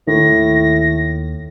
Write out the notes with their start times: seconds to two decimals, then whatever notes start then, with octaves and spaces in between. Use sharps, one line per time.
0.07 D#2 A2 A#6